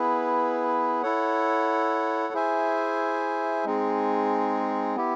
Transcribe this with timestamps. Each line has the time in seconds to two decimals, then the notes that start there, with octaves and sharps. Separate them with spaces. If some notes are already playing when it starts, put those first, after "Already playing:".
Already playing: B3 E4 G#4 B4
1.03 E4 A4 C#5 F#5
2.33 E4 G#4 C5 E5 G#5
3.65 G#3 C4 D#4 G#4
4.96 B3 E4 G4